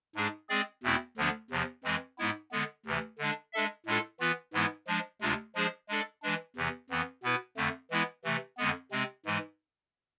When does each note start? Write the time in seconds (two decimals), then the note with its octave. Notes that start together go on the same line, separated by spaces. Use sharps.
0.15 G#2 G#3 D4 G#4
0.49 G#3 C4 G#4 D5
0.83 E2 B2 A3 C4 E4
1.17 D2 D3 F3 B3 D4
1.50 E2 C3 F3
1.84 F2 E3 G#3 C4
2.18 G#2 G#3 B3 E4
2.51 D3 G#3 B3
2.85 D2 C3 E3
3.18 D3 G#3 D4
3.53 G#3 D4 A4 E5
3.86 A2 G#3 D4 F4 A4
4.20 E3 B3 F4 B4
4.53 G#2 E3 G#3 B3 E4
4.87 F3 G#3 D4
5.21 D2 C3 G#3 D4 F4
5.55 F3 G#3 D4 G#4 C5
5.89 G#3 D4 A4 D5
6.22 E3 G#3 D4
6.56 E2 C3 E3
6.90 F2 E3 B3
7.23 B2 B3 E4 B4
7.57 F2 D3 A3
7.90 E3 G#3 B3 E4
8.24 C3 E3 A3
8.58 F2 D3 G#3 B3
8.91 C3 G#3 C4
9.25 G#2 E3 G#3